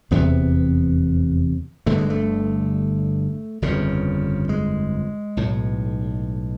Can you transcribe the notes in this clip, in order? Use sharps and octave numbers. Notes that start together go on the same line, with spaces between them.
F1 E2 C3 B3
G1 G2 D3 A3
G#3
A3
G1 F2 C#3
G#3
B1 A2